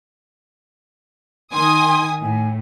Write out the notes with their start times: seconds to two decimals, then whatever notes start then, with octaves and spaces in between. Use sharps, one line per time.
1.53 D#3 G#5 C6 D#6
2.22 A2 G#5